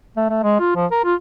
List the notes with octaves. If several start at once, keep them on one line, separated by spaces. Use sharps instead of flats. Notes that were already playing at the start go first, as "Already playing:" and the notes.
A3
A3
G#3
F4
F3
A#4
F4